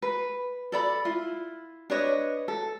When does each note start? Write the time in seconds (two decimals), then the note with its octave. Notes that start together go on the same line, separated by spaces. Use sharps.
0.02 B4
0.72 A4 D5 B5
1.05 E4 F4
1.90 D4 B4 C#5 D#5
2.48 A4